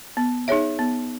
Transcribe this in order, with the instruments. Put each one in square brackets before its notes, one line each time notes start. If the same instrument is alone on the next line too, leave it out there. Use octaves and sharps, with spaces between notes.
[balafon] B3
D#4 G#4 C#5 E5
B3